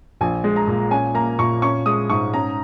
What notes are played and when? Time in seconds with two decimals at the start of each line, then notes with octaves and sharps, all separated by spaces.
0.21 A#1 G#5
0.44 G#3
0.56 A#5
0.67 A#2
0.91 C#4 G#5
1.14 A#3 A#5
1.39 A#2 C#6
1.62 C#4 C#6
1.86 G#3 D#6
2.10 G#2 C#6
2.34 C#4 A#5